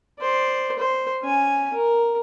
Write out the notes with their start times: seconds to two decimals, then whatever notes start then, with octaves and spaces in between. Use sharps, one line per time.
0.19 C5 D5
0.79 C5
1.23 C#4 G#5
1.73 A#4